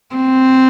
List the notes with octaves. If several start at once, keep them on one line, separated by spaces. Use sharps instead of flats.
C4